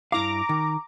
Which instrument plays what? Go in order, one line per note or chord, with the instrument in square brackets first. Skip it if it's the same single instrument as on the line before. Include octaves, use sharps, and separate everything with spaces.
[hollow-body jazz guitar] G2 E4 F5 [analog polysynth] A#5 D6
[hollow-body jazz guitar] D#3